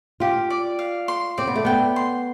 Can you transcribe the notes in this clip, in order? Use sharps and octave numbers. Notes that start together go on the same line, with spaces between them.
F4 G4
D5
F5
C6
C4 D5
B3
A3
B3 G5
C6